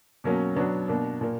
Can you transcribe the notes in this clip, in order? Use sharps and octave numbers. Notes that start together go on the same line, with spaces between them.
B2 F#3 A#3 C#4
B2 F#3 B3 D4
B2 A#3 D4
A#2 A#3